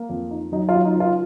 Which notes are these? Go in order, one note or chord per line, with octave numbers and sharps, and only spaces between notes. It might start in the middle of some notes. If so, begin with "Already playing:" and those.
Already playing: A#3
F2
D#4
F#3 D#4
F#3 F4
D#4
C#2 F4